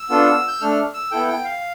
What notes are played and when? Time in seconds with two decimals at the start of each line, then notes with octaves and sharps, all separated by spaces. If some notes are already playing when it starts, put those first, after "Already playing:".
Already playing: E6
0.10 B3 D4 F4 A4
0.48 G6
0.61 A3 D4 A4 F6
0.94 E6
1.11 B3 E4 A4 G5
1.28 G5
1.44 F5